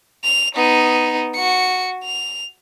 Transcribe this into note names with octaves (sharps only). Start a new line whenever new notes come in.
F7
B3 D#4
F#4 C#7
F7